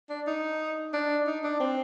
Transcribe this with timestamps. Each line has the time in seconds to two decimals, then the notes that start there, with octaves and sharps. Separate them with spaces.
0.10 D4
0.27 D#4
0.93 D4
1.27 D#4
1.43 D4
1.60 C4